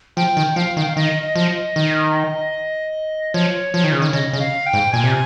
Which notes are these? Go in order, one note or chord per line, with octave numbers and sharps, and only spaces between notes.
F3 G5
D#3
F3 F5
D#3
G5
F5
D#3 D#5
D#5
F3
D#5
D#3
F3 C#5
F3
D#3
C#3
D#3
C#3 D#5
C#3
F5
G5
G#2
A#2 G#5
C3